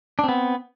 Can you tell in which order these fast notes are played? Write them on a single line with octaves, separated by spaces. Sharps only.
D4 C4 B3